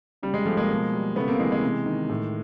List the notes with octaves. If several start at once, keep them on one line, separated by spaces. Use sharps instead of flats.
C#3 G3
G#3
F3 G3 A3
G#3 A#3
B2
G3
C#3 A3 B3
A#3 C4
E3 G#3
G#3
C3
D#3
A2